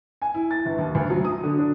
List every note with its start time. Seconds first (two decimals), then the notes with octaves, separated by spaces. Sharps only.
0.22 G#5
0.34 E4
0.51 A6
0.66 G1
0.78 D#2
0.95 D2
1.10 F#3
1.25 D#6
1.43 D3
1.58 D4